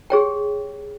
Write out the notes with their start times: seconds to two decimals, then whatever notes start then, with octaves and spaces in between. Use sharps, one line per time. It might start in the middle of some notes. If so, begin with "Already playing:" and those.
0.10 G4 G#4 C#5 G5